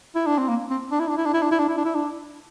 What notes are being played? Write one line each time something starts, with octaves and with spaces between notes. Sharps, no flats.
E4
D4
C4
A#3
C4
D4
E4
D4
E4
D4
E4
D4
E4
D4
E4
D4
E4
D4